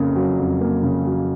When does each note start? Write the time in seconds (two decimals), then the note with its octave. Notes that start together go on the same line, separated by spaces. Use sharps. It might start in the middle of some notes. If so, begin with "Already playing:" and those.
Already playing: F2 C#3 A#3
0.16 F#3
0.38 F2
0.61 A#3
0.83 C#3
1.06 F#3